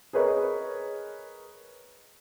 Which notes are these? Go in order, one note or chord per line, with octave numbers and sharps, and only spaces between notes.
G#4 A#4 B4 C#5 D#5